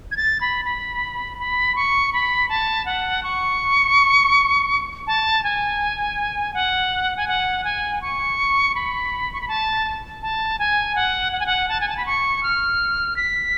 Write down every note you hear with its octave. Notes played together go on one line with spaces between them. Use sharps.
G#6
A6
B5
B5
B5
C#6
B5
A5
F#5
C#6
A5
G#5
F#5
G#5
F#5
G#5
C#6
B5
C#6
B5
A5
A5
G#5
F#5
F#5
G#5
F#5
A5
G#5
A5
B5
C#6
F6
B6